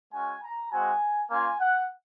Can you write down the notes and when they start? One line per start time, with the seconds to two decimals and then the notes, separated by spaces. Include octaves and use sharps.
0.12 G#3 C#4 F#4 G#5
0.43 A#5
0.71 G#3 C4 F#4 G#5
1.30 A#3 C#4 F4 G#5
1.60 F#5